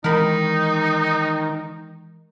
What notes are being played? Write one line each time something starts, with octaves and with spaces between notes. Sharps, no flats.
D#3 E3 G#3 D#4 A#4 B5